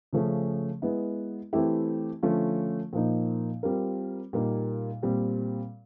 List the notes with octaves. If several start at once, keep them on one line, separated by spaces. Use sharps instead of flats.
C#3 F3 A3 C#4
G#3 B3 E4
E3 A3 C4 E4 G4
D3 F3 A3 C#4 F4
A#2 F3 A#3 D#4
G3 C4 F4 A#4
A#2 G3 A#3 D#4
A#2 G3 C4